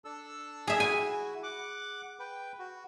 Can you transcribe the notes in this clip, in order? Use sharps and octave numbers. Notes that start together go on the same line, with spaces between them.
D4 A4 E6
G#4 E5
E4 F#4 G#5
F#5 D6
B4 G5
F#4